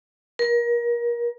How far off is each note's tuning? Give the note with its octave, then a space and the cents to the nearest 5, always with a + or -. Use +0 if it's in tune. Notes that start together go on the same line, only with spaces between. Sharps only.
A#4 +30